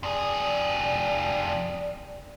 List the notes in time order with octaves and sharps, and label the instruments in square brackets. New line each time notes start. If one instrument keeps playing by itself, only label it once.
[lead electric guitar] F2 G#4 [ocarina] D5